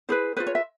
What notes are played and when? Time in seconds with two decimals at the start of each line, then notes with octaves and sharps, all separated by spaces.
0.09 E4 G#4 B4 C5
0.37 F4 G#4 B4 C5
0.47 C#5
0.55 E5